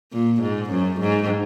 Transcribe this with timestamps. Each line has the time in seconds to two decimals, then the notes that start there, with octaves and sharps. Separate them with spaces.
0.13 A#2
0.42 G#2
0.71 F#2
1.01 G#2